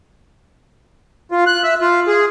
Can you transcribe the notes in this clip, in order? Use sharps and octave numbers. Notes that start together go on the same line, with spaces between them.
F4
F#6
E5
F4
G#4